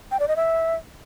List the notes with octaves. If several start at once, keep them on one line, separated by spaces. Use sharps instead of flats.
G5
D5
D#5
E5